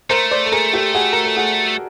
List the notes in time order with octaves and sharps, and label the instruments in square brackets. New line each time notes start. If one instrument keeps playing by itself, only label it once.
[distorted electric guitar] A3 [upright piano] A#4 C5
[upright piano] C5 D5
A4
G#4 A#4
G4 A4
F#4 G#4
A#4
A4
F#4 G#4